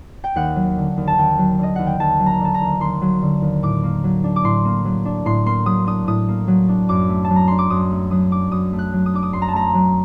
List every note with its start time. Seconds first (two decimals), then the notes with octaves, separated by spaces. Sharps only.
0.24 G5
0.36 D#2 F#5
0.56 F#3
0.77 D3
0.97 D#2
1.07 A5
1.18 D#2 G5
1.38 F#3
1.58 D3 D#5
1.76 D#2 F#5
1.87 G5
2.00 D#2 A5
2.20 F#3
2.26 A#5
2.40 D3 A5
2.54 A#5
2.61 D#2
2.80 D#2 C6
3.01 F#3
3.22 D3
3.42 D#2
3.63 A2 D6
3.84 A#3
4.04 F#3
4.24 D4
4.36 D6
4.43 A2 C6
4.65 A#3
4.85 F#3
5.05 D4
5.25 A2 C6
5.46 A#3 C6
5.66 F#3 D#6
5.87 D4 D#6
6.07 A2 D#6
6.28 A#3
6.48 F#3
6.68 D4
6.89 F#2 D6
7.09 A3
7.24 A5
7.30 F#3
7.36 A#5
7.48 D4 C6
7.58 D6
7.70 F#2 D#6
7.91 A3
8.11 F#3 D#6
8.31 D4 D6
8.52 F#2 D#6
8.73 A3
8.79 F#6
8.93 F#3
9.06 D#6
9.14 D4 D6
9.23 D#6
9.33 F#2 C6
9.42 A#5
9.48 A5
9.54 A3 A#5
9.74 F#3